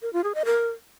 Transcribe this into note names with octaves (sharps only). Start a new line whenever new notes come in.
A#4
F4
G#4
D#5
A#4